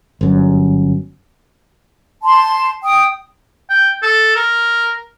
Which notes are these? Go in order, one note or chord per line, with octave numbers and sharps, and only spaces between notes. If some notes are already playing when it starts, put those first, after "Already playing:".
G1 F#2
A5 C6
G5 D#6
G5
A4
A#4